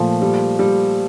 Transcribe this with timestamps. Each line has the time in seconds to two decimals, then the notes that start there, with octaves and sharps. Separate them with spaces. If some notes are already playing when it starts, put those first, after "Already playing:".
Already playing: A#2 F3 A3
0.22 G3
0.59 G3